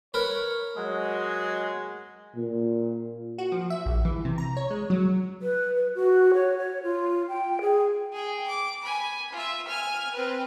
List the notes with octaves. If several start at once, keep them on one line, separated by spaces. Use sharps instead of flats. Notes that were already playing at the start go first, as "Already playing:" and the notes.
A#4 B4 C#5
F#3 G#3
A#2
F#4
F3
E5
A#1
E3
C3
A#5
C#5
G#3
F#3
B4
B4
F#4
C#5
C#5
F4
G5
G#4
G#4 G5
D6
G#5 B5
F4 E5
G#5 F6
C4 B4